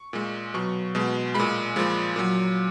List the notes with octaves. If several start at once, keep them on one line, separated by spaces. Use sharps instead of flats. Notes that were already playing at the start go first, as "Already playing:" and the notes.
Already playing: C#6
A#2 G#3
B2 F#3 C#6
B2 G#3
A#2 G#3 B5
A#2 F3 G#3
A#2 F#3